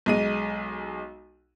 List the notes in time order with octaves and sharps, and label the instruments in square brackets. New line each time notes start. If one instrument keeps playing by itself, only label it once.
[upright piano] B1 G#3 D#7